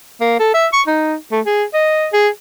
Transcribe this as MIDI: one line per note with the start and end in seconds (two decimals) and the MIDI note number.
0.21 0.39 58
0.39 0.50 69
0.54 0.67 76
0.73 0.82 85
0.87 1.15 63
1.32 1.41 57
1.46 1.64 68
1.74 2.07 75
2.13 2.29 68